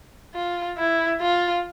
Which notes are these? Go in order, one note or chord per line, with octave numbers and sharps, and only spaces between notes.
F4
E4
F4